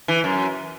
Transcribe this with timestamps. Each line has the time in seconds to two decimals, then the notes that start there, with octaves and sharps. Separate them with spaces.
0.08 E3
0.24 F#2